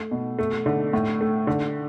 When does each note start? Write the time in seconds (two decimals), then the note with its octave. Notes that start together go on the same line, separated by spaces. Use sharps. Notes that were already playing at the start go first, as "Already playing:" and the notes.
Already playing: A3
0.11 B2
0.39 A3
0.66 D3
0.93 A2
1.21 A3
1.47 D3